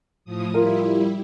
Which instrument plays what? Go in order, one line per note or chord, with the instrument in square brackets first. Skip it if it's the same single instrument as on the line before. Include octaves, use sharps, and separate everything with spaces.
[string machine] A2 F3 D#6
[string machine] G3 E4 [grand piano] F4 A#4